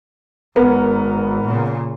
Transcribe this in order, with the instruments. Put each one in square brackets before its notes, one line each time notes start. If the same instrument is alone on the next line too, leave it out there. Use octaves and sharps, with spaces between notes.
[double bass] G#1 [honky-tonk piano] B3 A#4
[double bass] A#2 C#3